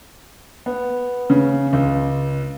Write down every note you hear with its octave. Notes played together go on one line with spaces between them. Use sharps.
B3
C#3
C#2